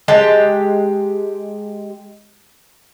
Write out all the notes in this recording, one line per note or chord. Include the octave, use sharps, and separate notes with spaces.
G#3 G4 G5 A5